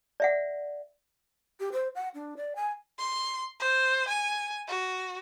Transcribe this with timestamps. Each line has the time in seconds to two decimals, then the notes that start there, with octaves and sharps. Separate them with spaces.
0.20 D5 E5 F#5
1.60 G4
1.72 C5
1.95 F#5
2.15 D4
2.37 D5
2.56 G#5
2.99 C6
3.60 C5
4.08 G#5
4.67 F#4